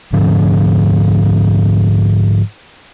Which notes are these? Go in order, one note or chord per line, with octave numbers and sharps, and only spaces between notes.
G#2 D3 F3 C#4